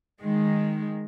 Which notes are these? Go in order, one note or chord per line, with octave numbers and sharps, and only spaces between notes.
D#3 G#3